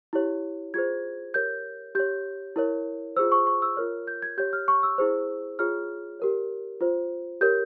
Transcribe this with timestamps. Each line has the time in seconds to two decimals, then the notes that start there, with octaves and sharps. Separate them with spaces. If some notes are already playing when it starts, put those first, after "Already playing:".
0.13 E4 G4 C#5
0.74 F4 G#4 C5 G#6
1.34 G4 A#4 C#5 G6
1.95 G4 C#5 G6
2.56 E4 A#4 C#5
3.16 F4 G#4 C5 E6
3.32 C#6
3.47 C#6
3.62 E6
3.77 F4 A#4 C#5 F6
4.07 G6
4.22 G#6
4.38 G4 C#5 G6
4.53 F6
4.68 C#6
4.83 E6
4.98 E4 G#4 C5
5.59 F4 G#4 C#5 F6
6.20 G4 A#4 C#5
6.81 F4 C5
7.41 G4 A#4 C#5 G6